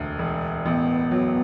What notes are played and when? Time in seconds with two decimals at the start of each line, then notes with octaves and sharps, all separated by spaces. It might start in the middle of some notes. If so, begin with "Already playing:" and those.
Already playing: E1 D2 D3
0.19 E1
0.65 A1 B3
1.11 F#3